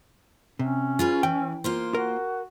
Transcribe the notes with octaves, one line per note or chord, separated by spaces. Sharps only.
C3 C#4
F4 G#4 B4
E3 G5
A#3 F4 C5
F#4 A#4